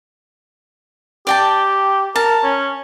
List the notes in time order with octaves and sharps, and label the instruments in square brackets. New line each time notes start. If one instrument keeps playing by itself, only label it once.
[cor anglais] G4 [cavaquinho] D5 G5 A5
[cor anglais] A#4 [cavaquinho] A5
[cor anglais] C#4